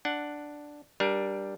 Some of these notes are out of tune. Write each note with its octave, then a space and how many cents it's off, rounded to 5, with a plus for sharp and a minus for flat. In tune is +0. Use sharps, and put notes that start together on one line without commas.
D4 +0 F#5 +0
G3 +0 D4 +0 A#4 +30